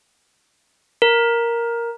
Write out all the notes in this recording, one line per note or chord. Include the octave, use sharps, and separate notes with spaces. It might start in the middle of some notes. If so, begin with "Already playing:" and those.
A#4